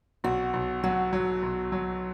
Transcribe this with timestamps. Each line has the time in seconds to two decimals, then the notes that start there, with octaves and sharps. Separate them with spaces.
0.24 B1 F#4
0.54 B1
0.84 F#3 F#4
1.13 F#3
1.43 B1
1.72 F#3